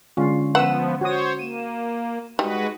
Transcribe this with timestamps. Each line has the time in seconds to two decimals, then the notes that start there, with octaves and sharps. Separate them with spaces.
0.17 D3 G#3 C#4 F4
0.55 F3 B3 B4 F#5 E6
1.01 F#4 C5 C#5 D#6
1.39 A#3 D#7 E7
2.39 G3 G#3 D#4 F#4 B4